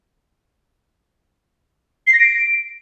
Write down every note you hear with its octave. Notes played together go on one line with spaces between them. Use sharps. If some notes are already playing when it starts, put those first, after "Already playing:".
C7
A#6
D7